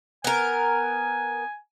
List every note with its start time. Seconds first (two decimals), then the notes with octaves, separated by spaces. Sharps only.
0.24 B3 A#4 G#5